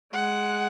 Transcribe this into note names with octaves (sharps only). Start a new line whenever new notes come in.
G#3 F#5